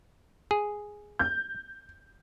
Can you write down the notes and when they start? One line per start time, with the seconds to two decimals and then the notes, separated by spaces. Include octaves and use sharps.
0.51 G#4
1.19 G6